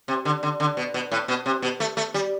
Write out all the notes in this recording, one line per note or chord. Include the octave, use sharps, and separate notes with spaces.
C3
D3
D3
D3
B2
B2
A2
B2
C3
B2
A3
A3
G3